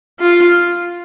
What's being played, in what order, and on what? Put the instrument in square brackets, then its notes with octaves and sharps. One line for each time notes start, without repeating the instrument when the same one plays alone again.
[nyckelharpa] F4